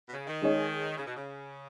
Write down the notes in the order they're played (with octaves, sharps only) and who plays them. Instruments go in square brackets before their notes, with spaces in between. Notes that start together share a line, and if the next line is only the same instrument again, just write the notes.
[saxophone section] B2
C#3
D#3
[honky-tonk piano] G#3 D#4 G#4 C#5
[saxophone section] C#3
B2
C#3